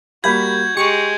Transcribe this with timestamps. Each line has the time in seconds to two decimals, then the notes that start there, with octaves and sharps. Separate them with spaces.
0.24 G3 A#3 F#4 B5 G6 G#6
0.77 G#3 G4 C#6 C#7